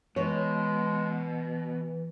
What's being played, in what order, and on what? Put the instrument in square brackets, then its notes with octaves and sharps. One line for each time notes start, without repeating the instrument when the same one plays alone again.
[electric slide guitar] B2 [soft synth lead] E3 [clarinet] G#3 [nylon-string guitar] C#5